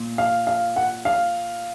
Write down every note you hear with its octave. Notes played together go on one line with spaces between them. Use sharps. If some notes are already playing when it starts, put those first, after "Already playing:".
Already playing: A#2
F5
F5
F#5
F5